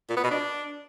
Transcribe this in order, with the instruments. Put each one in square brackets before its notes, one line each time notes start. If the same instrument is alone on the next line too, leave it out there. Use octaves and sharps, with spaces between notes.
[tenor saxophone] A#2
B3
B2
D4